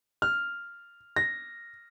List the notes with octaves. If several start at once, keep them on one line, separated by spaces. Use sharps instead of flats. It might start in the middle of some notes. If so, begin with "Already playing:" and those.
F6
A#6